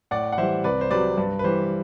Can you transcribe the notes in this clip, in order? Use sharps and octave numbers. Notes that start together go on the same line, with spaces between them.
A2 D5 F#5
F#5
E3 G3 C5 E5
C2 B4 D5
C5
C3 F#3 B4 D5
G2 B4
B4
E3 G3 C5